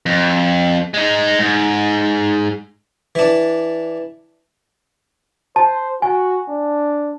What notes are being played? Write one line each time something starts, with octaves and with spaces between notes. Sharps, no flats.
F2
G#3 D#4
G#2
E3 D4
C5 A5
F#4 G#5
D4